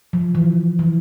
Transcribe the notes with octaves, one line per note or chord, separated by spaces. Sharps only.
F3
E3
E3